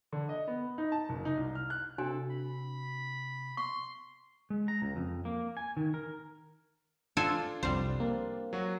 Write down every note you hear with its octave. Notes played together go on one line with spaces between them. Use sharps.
D3
D#5
B3
D#4
A5
F#1
D#4
C2
F6
F#6
C3 D4 F#4 A4 G#5
B5
C6 C#6
G#3
A#5
C#2
F2
A#3
G#5
D#3
A#4
D4 F4 A4 C5 G#5
C2 F2 G3 C5
A#3 C4
F#3 F#4